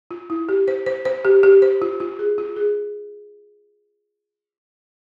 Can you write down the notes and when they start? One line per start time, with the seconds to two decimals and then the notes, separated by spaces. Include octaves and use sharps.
0.11 F4
0.30 E4
0.49 G4
0.68 C5
0.86 C5
1.05 C5
1.25 G4
1.43 G4
1.62 C5
1.82 F4
2.00 F4
2.19 G#4
2.38 F4
2.56 G#4